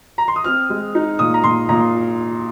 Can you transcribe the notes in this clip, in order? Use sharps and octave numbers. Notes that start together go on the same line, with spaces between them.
A#5
C6
D#6
C4 F6
G#3
D#4
A#2 D#6
A#5
A#2 C6
A#2 A#5